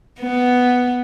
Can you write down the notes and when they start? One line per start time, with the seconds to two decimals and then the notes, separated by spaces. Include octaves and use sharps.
0.20 B3